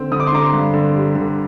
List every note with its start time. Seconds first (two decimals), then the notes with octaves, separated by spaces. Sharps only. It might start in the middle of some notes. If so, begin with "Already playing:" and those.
Already playing: D3 C4
0.12 D3 D#6
0.20 D6
0.27 C6
0.33 D3 A#5 D6
0.53 G2
0.74 D3
0.95 G3
1.15 D3